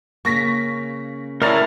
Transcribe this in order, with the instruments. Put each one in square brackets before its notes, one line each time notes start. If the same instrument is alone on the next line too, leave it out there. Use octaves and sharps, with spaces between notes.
[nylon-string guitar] C#3 A#3 [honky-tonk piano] C#6 A#6 B6
[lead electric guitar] A2 [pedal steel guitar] A#4 A#5 [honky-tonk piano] D5 A6